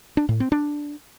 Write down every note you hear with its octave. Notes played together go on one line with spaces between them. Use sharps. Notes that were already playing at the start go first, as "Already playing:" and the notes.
D4
A2
C4
D4